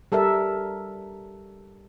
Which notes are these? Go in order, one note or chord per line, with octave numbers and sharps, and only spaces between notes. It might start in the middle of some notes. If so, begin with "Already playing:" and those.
G3 A4 A#4 E5